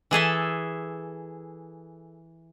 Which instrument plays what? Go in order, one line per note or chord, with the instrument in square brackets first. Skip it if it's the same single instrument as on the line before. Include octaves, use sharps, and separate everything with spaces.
[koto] E3 G#4 A4 E5